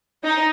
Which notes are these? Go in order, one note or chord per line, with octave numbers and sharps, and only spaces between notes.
D#4